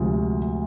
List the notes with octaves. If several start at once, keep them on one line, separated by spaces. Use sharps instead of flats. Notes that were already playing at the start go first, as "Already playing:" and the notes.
Already playing: D2 C3 F3 G#3